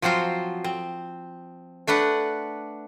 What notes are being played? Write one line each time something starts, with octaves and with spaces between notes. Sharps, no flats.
F3 F#3 C4 F4 C5
C4
A3 D4 B4 F#5